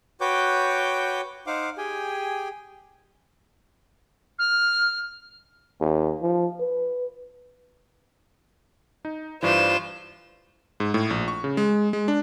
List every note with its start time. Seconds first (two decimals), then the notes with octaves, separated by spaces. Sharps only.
0.21 F#4 B4 C#5 G5 D6 G6
1.47 D#4 C5 F5 F#5 D6
1.78 G4 G#4 G5 G#5
4.38 F6
5.81 D#2
6.22 F3
6.60 B4
9.05 D#4
9.43 G2 E3 F4 B4 C5 D5 E7
10.80 G#2
10.94 A2
11.10 A#1
11.28 C#6
11.44 C#3
11.57 G#3
11.93 G#3
12.08 D4